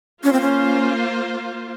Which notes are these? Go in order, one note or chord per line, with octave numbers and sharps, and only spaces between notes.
A#3 C#4 F4 C5
C4
C#4